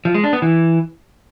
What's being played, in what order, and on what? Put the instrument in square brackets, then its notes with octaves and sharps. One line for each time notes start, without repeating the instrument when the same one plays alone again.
[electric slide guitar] F3
G#3
D4
B3
E3